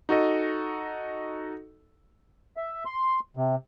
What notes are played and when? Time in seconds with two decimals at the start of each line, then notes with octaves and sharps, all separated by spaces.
0.09 D#4 F#4 A4 D#5
2.57 E5
2.86 C6
3.37 C3